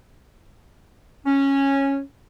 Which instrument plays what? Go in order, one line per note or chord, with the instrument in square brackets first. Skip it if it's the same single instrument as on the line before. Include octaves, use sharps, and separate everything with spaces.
[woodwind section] C#4